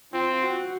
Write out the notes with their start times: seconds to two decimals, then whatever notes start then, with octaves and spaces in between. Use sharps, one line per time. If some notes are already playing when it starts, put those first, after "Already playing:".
0.13 C4 F4
0.42 F#4